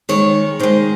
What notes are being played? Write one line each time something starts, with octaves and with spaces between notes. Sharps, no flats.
D#3 G#3 C#5
D#3 G#3 C5